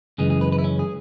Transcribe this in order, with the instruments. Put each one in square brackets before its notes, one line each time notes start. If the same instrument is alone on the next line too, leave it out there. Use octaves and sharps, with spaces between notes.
[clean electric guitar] F#2 C#3 E3 G#3 G#4
G#4
B4
B4
E4
C#4
G#4